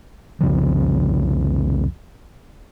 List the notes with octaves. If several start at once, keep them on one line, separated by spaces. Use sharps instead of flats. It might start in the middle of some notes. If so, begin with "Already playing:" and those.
C2 F2 C#3 F3